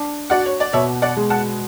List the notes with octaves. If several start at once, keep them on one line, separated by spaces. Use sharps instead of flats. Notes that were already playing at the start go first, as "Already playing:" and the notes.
Already playing: D4
F#4 D5 F#5
C#5
D5
B2 C#5 E5
D5 F#5
G#3
F#5 A5